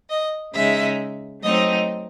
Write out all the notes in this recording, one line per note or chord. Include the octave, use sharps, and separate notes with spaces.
D#5
C#3 G#3 D#4 E5
F#3 A3 C4 D#4 D#5